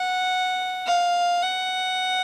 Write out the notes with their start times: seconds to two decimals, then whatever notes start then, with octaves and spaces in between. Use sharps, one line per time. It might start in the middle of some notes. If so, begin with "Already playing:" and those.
Already playing: F#5
0.86 F5
1.42 F#5